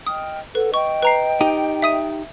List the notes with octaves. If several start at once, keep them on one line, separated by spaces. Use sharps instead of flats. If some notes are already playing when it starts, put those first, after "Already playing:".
D#5 G5 D#6 F6
A4 B4 F#5
D#5 G5 C#6
B4 A#5 C7
D#4 G4
E5 D#6 D#7